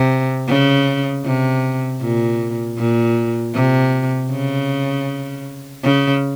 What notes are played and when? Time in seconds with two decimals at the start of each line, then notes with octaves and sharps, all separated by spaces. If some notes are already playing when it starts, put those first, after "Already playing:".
Already playing: C3
0.48 C#3
1.24 C3
2.01 A#2
2.78 A#2
3.54 C3
4.31 C#3
5.84 C#3